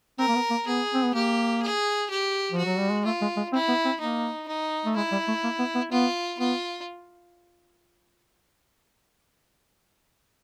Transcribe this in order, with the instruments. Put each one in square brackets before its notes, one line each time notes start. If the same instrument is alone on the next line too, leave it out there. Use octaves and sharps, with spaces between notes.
[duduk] C4 [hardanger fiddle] A#4
[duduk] A#3
B3
A#3
[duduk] B3 [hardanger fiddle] G#4
[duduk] C4
B3
[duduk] A#3 [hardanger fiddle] G4
[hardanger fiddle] G#4
G4
[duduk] F3
[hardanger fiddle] F#4
[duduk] F#3
G3
G#3
[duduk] A3 [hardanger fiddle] F4
[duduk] G#3
G#3
[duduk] C4 [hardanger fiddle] E4
[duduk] B3
C4
[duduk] A#3 [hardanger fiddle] D#4
[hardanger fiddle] D#4
[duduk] A3
[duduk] G#3 [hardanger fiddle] E4
[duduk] G3
A3
A#3
B3
B3
[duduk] B3 [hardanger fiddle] F4
[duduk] B3 [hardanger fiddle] F4